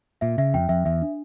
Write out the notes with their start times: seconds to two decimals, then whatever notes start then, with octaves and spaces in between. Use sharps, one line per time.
0.21 A#2 E5
0.38 C#3 E5
0.54 F2 G5
0.69 F2 E5
0.85 E2 E5
1.02 D4